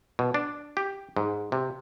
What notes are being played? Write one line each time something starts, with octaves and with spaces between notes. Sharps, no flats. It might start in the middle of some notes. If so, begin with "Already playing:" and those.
B2
D4
G4
G#2
C3